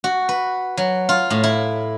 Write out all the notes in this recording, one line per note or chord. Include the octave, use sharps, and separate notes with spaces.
F#4
B4
F#3
F4
A2
E4